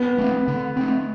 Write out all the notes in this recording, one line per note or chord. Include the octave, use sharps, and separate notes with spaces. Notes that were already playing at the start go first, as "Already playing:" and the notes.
Already playing: B3
A3 C4
D3
A3 C4